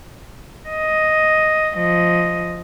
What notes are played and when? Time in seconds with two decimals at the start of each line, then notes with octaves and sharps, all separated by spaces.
0.69 D#5
1.74 F3 D#5